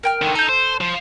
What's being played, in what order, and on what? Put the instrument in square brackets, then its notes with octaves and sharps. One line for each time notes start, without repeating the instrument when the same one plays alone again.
[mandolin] A#4 G5 F6
[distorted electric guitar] D3 D#3
[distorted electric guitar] D#4 [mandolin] A4 G6
[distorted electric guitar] C5
F3